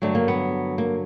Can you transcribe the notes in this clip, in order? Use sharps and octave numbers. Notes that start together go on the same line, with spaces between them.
G2 D3 F#3 A3 D4
A#3
B3
A#3